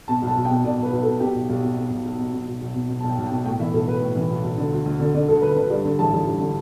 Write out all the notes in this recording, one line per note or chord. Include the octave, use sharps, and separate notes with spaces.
B2 A5
B1 A5
B1
G5
B2
B2 D5
B1 B4
B1
A4
B2
B2 G4
B1
B1 G4
B2
B2
B1
B1
B2
B2
B1
B1
B2
B2
A5
B1 G5
B1
G5
B2
A2 G5
E3 E5
B1 A4
B1 B4
A2
E3
B1
B1
D3
D2
D2
D3
D3 D5
D2 A4
D2 B4
D3 B4
G2 D5
D3
A1 A5
A1
G2
D3